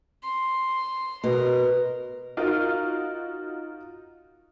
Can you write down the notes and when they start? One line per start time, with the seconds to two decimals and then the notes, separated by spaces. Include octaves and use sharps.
0.23 C6
1.24 B2 A#4
2.37 D#4 F4 F#4 A#4